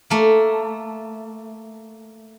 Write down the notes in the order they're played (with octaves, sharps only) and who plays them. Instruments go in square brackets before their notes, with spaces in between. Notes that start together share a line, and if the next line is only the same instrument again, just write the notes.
[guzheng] A3 A#3